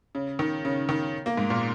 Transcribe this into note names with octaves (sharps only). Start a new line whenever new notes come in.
C#3
D#3
C#3
D#3
A#3
G#2
A#2